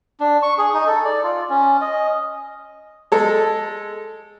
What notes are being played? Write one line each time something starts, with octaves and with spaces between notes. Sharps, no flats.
D4
C#6
G#4
D#4
A4
D5
F4
C#4
D#5
G#3 A4